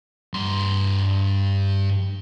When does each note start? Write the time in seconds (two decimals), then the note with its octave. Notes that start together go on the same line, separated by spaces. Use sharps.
0.34 G2 C6